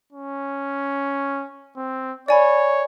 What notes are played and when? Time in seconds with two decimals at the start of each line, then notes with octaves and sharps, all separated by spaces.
0.13 C#4
1.76 C4
2.28 C#5 D5 G#5 B5